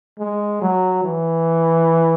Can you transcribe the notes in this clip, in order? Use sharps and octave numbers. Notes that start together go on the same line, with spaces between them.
G#3
F#3
E3